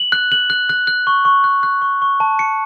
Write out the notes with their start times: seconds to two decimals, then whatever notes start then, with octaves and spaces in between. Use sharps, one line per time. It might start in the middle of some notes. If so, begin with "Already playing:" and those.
Already playing: F#7
0.12 F#6
0.32 F#7
0.50 F#6
0.69 F#6
0.87 F#6
1.07 C#6
1.25 C#6
1.44 F#6
1.63 F#6
1.82 C#6
2.02 C#6
2.20 A5
2.39 C#7